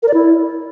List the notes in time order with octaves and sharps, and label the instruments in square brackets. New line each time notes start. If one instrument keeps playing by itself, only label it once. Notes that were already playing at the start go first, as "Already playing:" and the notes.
[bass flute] A#4
D5
E4